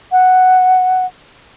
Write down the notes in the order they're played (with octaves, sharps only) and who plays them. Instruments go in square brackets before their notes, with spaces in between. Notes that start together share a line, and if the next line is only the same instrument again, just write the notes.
[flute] F#5